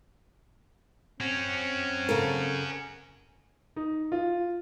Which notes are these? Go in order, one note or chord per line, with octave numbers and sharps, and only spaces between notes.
C4 C#4 F#4
C#3 A4 A#4
D#4
F4